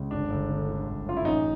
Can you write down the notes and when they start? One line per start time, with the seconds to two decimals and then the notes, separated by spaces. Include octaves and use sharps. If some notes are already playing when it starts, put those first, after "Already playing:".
Already playing: C#2
0.11 G1 D4
0.30 G1
0.50 D3
0.69 D3
0.88 G1
1.06 F#2 F4
1.17 E4
1.25 A1 D#4